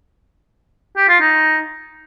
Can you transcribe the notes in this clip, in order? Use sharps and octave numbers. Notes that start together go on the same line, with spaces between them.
G4
F4
D#4